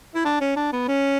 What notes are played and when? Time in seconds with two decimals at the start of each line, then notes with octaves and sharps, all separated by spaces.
0.15 E4
0.25 D4
0.41 C#4
0.57 D4
0.73 B3
0.88 C#4